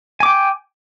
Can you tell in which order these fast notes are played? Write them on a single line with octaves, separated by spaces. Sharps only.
G#5 D6 G5